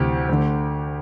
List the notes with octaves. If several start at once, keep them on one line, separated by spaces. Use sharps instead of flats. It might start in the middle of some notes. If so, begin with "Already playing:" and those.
Already playing: D2 C3 E3 G4
D2 D3